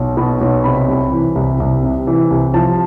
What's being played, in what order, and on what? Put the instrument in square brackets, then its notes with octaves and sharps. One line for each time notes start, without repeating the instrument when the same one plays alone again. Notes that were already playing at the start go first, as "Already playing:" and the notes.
Already playing: [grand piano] B1
B2 B5
B1
C3 B5
C2
E3
C2
C2
C3
E3
C2
F3 A5